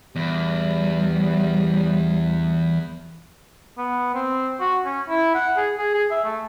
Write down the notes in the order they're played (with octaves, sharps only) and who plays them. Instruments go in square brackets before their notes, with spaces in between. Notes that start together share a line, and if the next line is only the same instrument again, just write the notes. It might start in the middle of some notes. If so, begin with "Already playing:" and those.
[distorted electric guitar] E2 [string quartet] G3
[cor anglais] B3
C4
F#4
C#4
E4
F#5
G#4
G#4
G#4
E5
A3